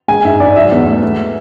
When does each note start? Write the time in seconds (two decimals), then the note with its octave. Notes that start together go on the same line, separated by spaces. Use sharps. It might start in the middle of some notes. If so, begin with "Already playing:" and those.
0.08 G#3 G#5
0.25 G#2 E5
0.40 G#2 D5
0.56 F#3 E5
0.72 E2
0.87 A3
1.03 A3